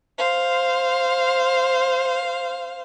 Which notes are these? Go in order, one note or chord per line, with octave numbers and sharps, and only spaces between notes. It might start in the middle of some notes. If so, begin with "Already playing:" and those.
C5 F5